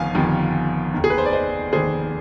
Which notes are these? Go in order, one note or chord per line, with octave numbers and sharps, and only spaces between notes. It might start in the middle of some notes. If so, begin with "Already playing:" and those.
Already playing: G1 F2 D#3 F5 G#5
G1 F2 D#3 G3
F1 D#2 D#3
G#4
B4
C5
D5
C5 D#5
F1 D#2 D#3 G#4 C5